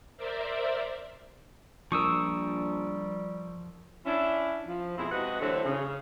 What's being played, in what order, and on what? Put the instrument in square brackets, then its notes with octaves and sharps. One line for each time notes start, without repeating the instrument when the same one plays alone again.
[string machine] A#4 C5 D5 E5
[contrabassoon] A#1 [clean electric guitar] F3 A#4 [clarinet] G3 [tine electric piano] C#6 D#6 E6
[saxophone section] C#4 D4 E4
F3
F2 B2 G#3 C4 E4
C3 G#3 F#4 B4 D#5 F#5
D3 E3 F#3 A3 C4
C#3